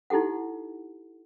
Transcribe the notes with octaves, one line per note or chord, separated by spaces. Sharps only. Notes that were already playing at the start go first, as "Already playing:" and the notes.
D#4 E4 G4 A4 F#5